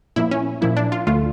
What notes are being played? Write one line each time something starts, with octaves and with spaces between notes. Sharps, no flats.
A#2 F3 A#3 E4
C#4
A#2 F3 A#3 E4
D4
F4
D2 D3 A3 F4